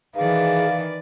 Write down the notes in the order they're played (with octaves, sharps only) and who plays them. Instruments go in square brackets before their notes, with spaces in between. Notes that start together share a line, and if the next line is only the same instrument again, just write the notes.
[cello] D#3 E3 [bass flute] G#4 [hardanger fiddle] B4 D5 [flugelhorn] F5